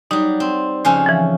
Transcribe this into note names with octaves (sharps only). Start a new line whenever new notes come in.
F#3 G3 D#4
C4
F2 C#3 C#4 C5 G#5
E3 F3